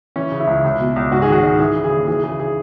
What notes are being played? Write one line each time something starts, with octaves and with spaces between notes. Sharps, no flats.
E3 C#4
C#3
E4
C#2
C#2
B2
C#2
G#2 F#4
G#4
D#3 F#4
G#2
E3 G#4
C#3
G#4
D#2
E3 G#4
C#3 G#4
G#4